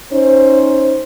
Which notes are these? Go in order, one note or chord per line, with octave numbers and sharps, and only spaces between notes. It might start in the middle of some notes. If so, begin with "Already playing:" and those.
C#4 D#4 C5